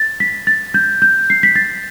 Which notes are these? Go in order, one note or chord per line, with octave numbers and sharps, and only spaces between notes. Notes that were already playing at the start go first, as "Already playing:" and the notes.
Already playing: A6
B6
A6
G6
G6
C7
B6
A6